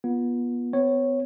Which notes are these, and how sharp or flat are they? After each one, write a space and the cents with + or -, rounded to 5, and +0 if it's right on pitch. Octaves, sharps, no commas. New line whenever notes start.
B3 -30 F4 +0
B3 +35 C#5 -10